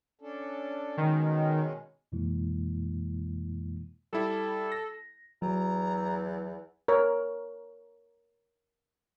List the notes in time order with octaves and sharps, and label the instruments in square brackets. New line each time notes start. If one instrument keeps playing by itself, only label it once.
[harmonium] C#4 D4 A4
[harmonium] B2 G#3 C#4 [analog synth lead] D#3
[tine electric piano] F2 B2 E3 G#3 A#3 E4
[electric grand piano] G3 E4 [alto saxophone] A4
[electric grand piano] A#6
[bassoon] E2 [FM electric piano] F#3 [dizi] A#5
[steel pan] A#4 C#5